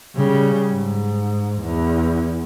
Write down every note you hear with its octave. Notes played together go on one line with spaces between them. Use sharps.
C#3 G3
G#2
E2